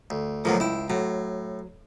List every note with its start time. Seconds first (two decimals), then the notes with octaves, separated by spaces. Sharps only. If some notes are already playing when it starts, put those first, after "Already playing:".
0.10 D2
0.45 D2 A2 F3 F#3 A#3 B3
0.60 C#2 E4 G5
0.90 A2 F#3